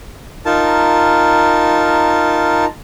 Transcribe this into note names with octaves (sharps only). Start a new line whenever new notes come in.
D#4 F4 A#4 A5